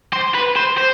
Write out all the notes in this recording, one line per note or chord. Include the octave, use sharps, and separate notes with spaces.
C5
B4
C5
C5